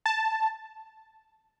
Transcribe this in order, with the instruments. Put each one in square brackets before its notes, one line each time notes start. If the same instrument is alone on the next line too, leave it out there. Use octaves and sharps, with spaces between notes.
[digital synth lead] A5